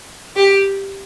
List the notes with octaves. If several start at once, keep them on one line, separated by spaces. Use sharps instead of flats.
G4